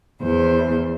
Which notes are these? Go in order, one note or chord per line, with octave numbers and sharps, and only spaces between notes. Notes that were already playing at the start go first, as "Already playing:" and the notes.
E2 C5